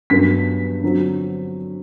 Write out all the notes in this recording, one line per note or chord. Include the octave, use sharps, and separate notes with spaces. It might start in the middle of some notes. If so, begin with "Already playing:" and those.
G2 F#3 B3 B6
D3 F#3 C4